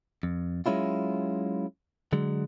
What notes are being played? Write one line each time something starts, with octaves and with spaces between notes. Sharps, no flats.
F2
F#3 G#3 C#4 E4 F4
D3 F#3 G#3